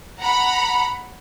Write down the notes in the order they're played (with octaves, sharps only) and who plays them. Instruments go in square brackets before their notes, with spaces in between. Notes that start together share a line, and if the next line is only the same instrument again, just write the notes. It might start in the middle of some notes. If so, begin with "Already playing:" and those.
[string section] F#5 A#5 B5